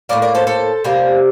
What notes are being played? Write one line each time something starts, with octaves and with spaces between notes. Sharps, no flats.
A2 G3 A#3 A#4 D5
A#4 D5
A4 C5
A4 C5
C3 G3 A#3